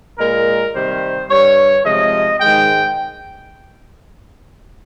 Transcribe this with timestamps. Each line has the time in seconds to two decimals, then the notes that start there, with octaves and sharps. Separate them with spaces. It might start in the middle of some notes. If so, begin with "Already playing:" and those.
0.18 A#2 G#3 A#4
0.73 C3 D#3 G3 C5
1.29 G2 G3 C#5
1.84 C3 F3 G#3 D#5
2.40 G#2 D#3 G#3 G5